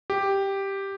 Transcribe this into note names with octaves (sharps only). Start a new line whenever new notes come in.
G4